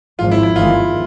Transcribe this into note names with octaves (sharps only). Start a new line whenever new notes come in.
G#1 G#2 F3 F4
E4
E4
G1 G2 D#3 G#3 F4